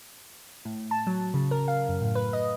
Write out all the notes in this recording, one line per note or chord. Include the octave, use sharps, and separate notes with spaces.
A2
A5
F#3
C#3
A#4
F5
F#2
A2
B4
D#5